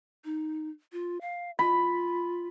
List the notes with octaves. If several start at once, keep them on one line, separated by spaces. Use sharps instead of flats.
D#4
F4
F5
F4 B5